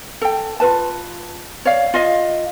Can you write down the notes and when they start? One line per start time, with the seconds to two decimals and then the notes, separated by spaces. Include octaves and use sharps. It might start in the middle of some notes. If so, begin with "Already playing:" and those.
0.22 A4 G5
0.60 F4 A#4 B4 A5
1.65 C#5 D5 F5
1.94 F4 D#5 F5